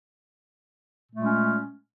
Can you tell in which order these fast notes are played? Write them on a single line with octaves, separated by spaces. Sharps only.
A#2 A3 G#3 C#4